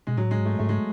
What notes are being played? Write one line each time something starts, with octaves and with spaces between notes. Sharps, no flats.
B2 G#3
A2 F#3
G#3
G#2
A3
G#2 A3
G#3